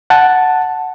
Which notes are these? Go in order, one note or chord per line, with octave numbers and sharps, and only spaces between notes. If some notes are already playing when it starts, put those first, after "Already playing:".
F#5 A5